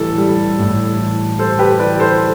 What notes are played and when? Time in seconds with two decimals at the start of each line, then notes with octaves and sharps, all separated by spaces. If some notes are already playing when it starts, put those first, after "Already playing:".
Already playing: A2 E3 G3 A4
0.18 G3
0.59 A2
0.99 E3
1.39 G3 A4 C5
1.59 G4 B4
1.79 E3 B4 D5
1.99 A4 C5